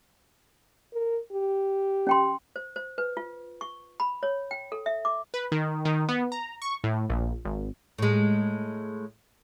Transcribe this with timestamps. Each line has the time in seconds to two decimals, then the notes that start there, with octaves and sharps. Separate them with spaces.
0.93 A#4
1.32 G4
2.07 C#4 G5 C6
2.56 C5
2.76 C5
2.98 B4
3.17 F4
3.61 C#6
4.00 B5
4.23 C#5
4.51 G5
4.72 A4
4.86 E5
5.05 D6
5.34 B4
5.52 D#3
5.85 D#3
6.09 B3
6.32 A#5
6.62 C#6
6.84 A2
7.10 A#1
7.45 G#1
7.98 A2 G#3